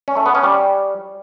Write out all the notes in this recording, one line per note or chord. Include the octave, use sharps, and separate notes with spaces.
C#4
A3
B3
C#4
G3